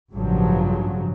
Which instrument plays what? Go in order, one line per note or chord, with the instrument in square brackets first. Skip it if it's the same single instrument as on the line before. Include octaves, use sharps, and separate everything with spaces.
[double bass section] A1 G2 C#3 F3 F#3